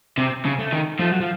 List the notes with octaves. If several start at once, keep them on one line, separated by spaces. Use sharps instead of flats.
C3 C4
C#3
A3
D#3
F3 A3
F#3
F3